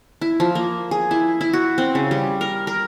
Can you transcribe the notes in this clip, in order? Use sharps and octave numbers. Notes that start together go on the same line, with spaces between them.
E4
F3
A#3
G#4
E4
E4
F#4
C4
C#3
G3
A#4
A#4